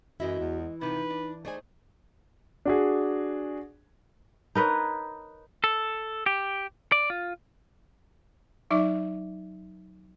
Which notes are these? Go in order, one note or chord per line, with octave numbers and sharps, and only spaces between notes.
F#2 E3 G#3 E4 F#4 D#5 E5
E2
C3 D#3 F3 D#4 B4
D4
A3 D#4 G#4 C5 D5 G#5
D4 F#4 G#4
D#4 A#4 B4 C#5
A4
G4
D5
F4
F#3 D#4 D5 E5 D6